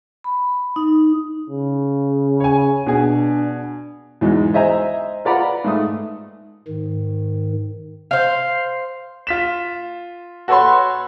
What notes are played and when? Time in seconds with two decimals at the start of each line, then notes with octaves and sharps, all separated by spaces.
0.24 B5
0.76 D#4
1.50 C#3
2.40 C#5 G#5
2.86 B2 D4 G#4
4.21 E2 G#2 F#3 G#3
4.54 C5 D#5 E5 G#5 A#5
5.25 F4 B4 D5 F#5 A#5 B5
5.64 G#2 A3 D#6
6.68 G#2 D#3
8.11 C5 F5
9.27 F4 B6 E7
10.48 F#4 A4 B4 C#5 B5 C6